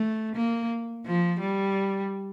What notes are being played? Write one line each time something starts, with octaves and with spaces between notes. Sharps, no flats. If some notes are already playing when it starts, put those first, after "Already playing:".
Already playing: A3
A#3
F3
G3